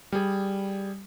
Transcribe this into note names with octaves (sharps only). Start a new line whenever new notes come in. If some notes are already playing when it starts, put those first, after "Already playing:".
G3 G#4